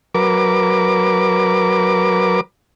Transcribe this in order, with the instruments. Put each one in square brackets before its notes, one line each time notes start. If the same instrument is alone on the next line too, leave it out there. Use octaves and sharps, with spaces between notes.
[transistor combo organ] F#3 A#4 B4 D6